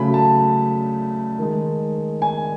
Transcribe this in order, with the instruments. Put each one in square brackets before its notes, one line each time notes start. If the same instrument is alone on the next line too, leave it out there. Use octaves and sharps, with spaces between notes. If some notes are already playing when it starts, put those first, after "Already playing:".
Already playing: [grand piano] C#3 F#3 A3 B5
A5
D#3 G#3
G#5